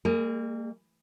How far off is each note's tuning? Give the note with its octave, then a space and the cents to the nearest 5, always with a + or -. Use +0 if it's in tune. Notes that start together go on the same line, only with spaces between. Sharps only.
G3 +45 A#3 -30 G#4 +0